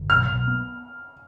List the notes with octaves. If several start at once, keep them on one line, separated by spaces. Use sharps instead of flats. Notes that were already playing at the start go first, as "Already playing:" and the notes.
Already playing: G1
B1 F6
B1
B3